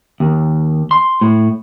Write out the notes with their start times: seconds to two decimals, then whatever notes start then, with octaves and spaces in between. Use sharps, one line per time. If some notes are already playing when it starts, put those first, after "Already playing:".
0.20 D#2
0.91 C6
1.21 A2